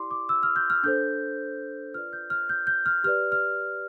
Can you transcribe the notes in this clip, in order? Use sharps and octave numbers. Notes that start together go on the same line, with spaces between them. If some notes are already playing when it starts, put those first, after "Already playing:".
Already playing: E4 G4 D5 C6 D6
D6
E6
F6
G6
F6
D4 A4 C5 G6
F4 B4 D5 F6
G6
F6
G6
G6
F6
G4 B4 D5 F6
F6